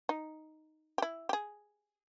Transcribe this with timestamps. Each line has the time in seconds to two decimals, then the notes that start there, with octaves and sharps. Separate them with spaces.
0.09 D#4
0.98 G4
1.02 E4
1.29 G4
1.33 G#4